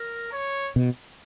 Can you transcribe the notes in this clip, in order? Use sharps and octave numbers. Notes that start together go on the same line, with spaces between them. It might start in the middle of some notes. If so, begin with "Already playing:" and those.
Already playing: A#4
C#5
B2